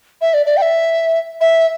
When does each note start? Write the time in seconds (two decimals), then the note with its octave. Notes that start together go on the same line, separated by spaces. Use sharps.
0.21 E5
0.34 D5
0.46 D5
0.57 G5
0.62 E5
1.41 E5